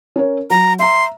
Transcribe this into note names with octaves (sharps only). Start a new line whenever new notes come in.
C#4 A#4 C#5
F#3 A#5
E5 A#5 C6